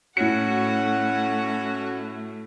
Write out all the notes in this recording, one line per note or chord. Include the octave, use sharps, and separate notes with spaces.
A2 A3 C#4 F#4 F#5 C#7